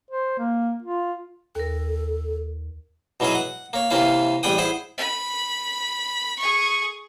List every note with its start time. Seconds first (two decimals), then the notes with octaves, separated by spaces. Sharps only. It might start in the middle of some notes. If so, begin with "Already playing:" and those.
0.11 C5
0.39 A#3
0.82 F4
1.55 D#2 A4 A#4
3.20 B2 E3 F#3 C#4 G#4
3.35 F#5
3.73 A#3 C#5
3.90 C3 E3 A#3 C#4 E4 F5
4.43 A1 G3 G#4 F#5 G5 D#6
4.58 E4 G#4 C5 F#5
4.98 B5
6.39 G#4 C#6